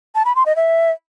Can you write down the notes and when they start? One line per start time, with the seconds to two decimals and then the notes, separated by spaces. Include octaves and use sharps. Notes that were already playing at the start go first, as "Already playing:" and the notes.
0.15 A5
0.25 B5
0.35 C6
0.46 D#5
0.56 E5